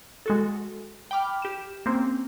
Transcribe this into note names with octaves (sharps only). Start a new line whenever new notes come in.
G#3 F#4 A4
G5 B5 D6 F6
G4 E7
A#3 C4 C#4